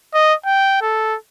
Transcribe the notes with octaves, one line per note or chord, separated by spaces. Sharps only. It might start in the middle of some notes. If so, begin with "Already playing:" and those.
D#5
G5
A4